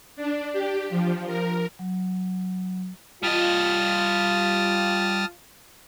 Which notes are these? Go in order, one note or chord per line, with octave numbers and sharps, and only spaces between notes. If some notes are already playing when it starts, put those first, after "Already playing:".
D4
G4
F3
A#4
F#3
G3 F4 D#5 A5 D#6 F6